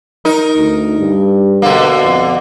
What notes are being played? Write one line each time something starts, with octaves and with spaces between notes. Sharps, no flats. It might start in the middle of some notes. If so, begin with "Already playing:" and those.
D#4 A#4
D2
G2
B2 D3 A#3
F2